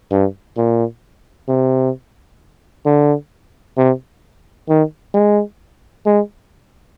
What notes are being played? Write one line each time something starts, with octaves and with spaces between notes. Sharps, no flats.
G2
A#2
C3
D3
C3
D#3
G#3
G#3